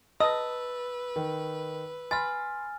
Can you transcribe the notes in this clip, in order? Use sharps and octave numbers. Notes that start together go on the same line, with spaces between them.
B4 D#5 A5 E6
D#3
G#5 B5 C6 F6 A6